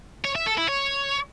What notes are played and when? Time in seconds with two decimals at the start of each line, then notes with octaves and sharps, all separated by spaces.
0.24 C#5
0.35 E5
0.46 A4
0.58 E4
0.69 C#5